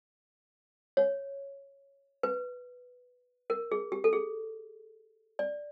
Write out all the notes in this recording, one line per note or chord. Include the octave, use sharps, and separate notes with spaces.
C#5
B4
A#4
G#4
G4
A4
G#4
D5